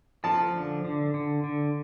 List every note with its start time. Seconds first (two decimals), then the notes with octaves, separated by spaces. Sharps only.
0.24 F3 A5
0.54 D3
0.85 D3
1.14 D3
1.44 D3